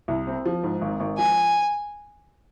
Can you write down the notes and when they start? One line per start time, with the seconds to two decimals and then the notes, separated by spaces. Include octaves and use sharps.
0.08 C2
0.27 C4
0.46 F3
0.63 G#2
0.81 G#1
1.00 G#1
1.17 F3 G#5